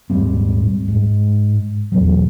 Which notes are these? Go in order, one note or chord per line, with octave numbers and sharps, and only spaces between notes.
D#1 G#2 G3 C4
G#2
E2 B2 F#3